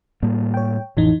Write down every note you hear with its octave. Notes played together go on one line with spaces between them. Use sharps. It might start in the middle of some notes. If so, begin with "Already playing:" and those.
A2 G3 A#3
C#5 G5
A1 F2 A2 E3 D#4